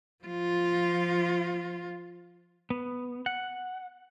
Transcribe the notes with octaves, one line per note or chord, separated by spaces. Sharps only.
F3 F4
B3
F#5